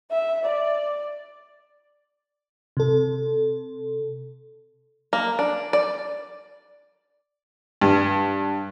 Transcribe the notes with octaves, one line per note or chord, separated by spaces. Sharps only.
E5
D5
C3 A4
A#3
D4
D5
G2